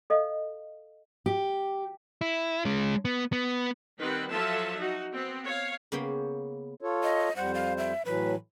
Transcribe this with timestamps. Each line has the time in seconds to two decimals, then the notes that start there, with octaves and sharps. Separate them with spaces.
0.10 A4 D#5 F5
1.26 G4
2.21 E4
2.65 G#3 C#4
3.05 B3
3.33 B3
3.99 D#3 G3 C4 B4 F#5
4.30 F3 F#3 F4 A4 E5 A5
4.76 D#4 F#4
5.13 B3 C4
5.44 C#5 F5
5.92 C#3 A#3 B3 C#5 G5
6.81 F4 A4 C#5
7.03 D#5
7.36 F2 G3 C5 F#5
7.54 F5
7.78 E5
8.05 A2 E3 F#3 B4